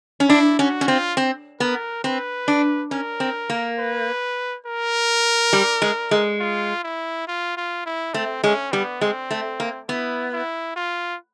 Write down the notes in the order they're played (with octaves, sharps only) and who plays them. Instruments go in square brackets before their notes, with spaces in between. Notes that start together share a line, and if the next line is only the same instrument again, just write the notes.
[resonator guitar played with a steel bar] C#4
[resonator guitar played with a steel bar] D4 [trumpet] E4
[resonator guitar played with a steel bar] C#4 [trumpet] F#4
[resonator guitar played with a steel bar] C#4
[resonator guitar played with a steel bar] C4 [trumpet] F4
[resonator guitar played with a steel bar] C4
[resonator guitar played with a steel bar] B3 [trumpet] A#4
[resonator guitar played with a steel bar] C4 [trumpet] B4
[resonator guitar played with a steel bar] D4
[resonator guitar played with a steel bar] C#4 [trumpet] A#4
[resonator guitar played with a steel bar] C4
A#3
[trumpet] B4
A#4
[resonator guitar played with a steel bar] G3
G#3
G#3
[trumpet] F4
E4
F4
F4
E4
[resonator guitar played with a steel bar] A3 [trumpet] C4
[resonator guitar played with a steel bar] G#3 [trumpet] C#4
[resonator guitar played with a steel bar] G3 [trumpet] B3
[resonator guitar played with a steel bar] G#3 [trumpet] C4
[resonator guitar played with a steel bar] A3
A#3
[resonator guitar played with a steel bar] B3 [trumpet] E4
[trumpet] E4
F4